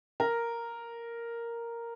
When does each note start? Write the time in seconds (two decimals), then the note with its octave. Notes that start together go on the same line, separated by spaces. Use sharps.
0.20 A#4